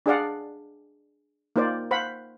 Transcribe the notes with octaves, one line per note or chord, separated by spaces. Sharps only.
D4 G#4 D5 F5 F#5
A#3 D#4 F4 C5 D5
C5 F5 F#5 B5